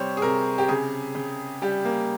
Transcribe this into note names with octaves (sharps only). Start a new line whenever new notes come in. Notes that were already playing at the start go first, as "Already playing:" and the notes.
Already playing: C3 G3 C5 C#5
G#4
C3 A#4
G4
C#3 G#4
C#3
G3 G4
A#3